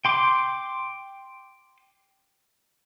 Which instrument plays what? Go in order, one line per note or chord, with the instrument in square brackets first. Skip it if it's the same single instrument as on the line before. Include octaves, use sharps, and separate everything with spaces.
[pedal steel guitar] G5 C6 D6